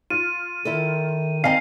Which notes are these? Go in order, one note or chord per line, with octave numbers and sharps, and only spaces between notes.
F4 D#7
D#3 E4 A4
D#3 C4 D#5 F5 G#5 C7